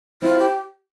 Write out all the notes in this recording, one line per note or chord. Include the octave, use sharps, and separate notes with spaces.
C4 E4 F4
G4